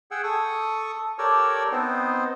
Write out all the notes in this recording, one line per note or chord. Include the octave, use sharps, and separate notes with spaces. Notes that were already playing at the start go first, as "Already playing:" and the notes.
G#4 F#5 G5 E6
A4 C#6 D#6
G4 A4 A#4 C#5 D5 E6
B3 C4 D#4 C5